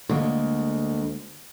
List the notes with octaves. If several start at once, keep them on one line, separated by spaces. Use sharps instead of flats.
D2 D3 G#3 A#3